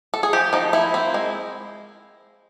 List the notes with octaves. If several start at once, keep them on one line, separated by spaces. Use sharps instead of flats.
A4
G#4
F3 G4
F3 D#4
A#3 E4
C4
G#3